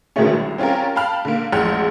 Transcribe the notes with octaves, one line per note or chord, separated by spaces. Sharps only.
B2 D3 D#3 G#3 A3 C#4
C2
C4 C#4 F4 G4 A#4
F5 G5 A5 B5 F6
D3 A#3
A1 F2 G#3 F#5 F6 G6